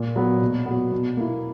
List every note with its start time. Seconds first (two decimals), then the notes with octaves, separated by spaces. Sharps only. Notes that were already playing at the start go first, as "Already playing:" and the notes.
Already playing: A#2
0.16 F#3 B3
0.42 B2
0.66 F#3 B3
0.92 B2
1.17 A#3 E4